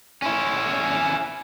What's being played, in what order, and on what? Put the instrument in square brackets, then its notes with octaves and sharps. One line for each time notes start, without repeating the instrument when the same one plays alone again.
[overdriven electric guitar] C#4 E4